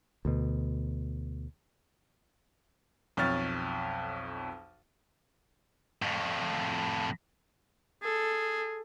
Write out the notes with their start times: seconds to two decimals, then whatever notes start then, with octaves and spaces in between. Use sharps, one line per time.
0.25 D2 B2
3.17 B1 F2 C#5 F6 A6
6.02 F2 A2
8.03 G#4 A4